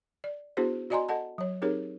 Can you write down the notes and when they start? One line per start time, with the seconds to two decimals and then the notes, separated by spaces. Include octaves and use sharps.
0.24 D5
0.57 B3 D4 E4 F#4 G#4 C5
0.90 F#4 D5 D#5 G#5 A#5 C6
1.09 A4 D#5 F#5 A5
1.38 F#3 C#5
1.62 C4 D#4 G4 G#4 A#4 C#5